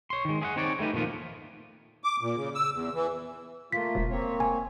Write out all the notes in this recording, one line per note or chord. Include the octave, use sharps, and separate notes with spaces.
C#5 C6
D#3 G#3
G#4 E5 F#5
C4 D#4 C#5 D5
G3 A3 D#4 B4
A#2 D#3 F3 B3 F4
D6
A#2
C#3
E6
E2
E3
A3 A#3 F4 B6
E1
A#3 C4 C#5
G#5